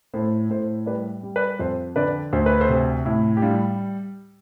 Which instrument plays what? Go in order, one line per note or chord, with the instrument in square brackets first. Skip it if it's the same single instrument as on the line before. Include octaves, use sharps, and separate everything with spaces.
[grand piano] A2 A4 C5
A2 A4 C5
G3 B4 D5
G3
B4 D5
F2 A4 C5
D3 B4 D5
D2 C5
B4
A4 C5
C3
A2 E4
G4
G3 D4 F4